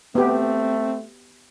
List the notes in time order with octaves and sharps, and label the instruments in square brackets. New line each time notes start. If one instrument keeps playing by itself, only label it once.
[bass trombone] A3 [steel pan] B3 G4 [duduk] C4